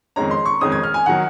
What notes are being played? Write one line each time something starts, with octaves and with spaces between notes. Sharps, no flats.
F2 D#3 G#3 C#4 A#5
C6
C#6
F2 D#3 G#3 C#4 D#6
G#6
F6
G#5
D#3 F#3 F#5